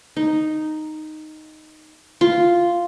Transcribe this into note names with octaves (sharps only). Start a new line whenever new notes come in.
D#4
F4